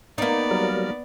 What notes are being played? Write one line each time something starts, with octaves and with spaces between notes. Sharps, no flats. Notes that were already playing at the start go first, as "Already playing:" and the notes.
A#3 B3 D#4 D5
F#3 G3 A#4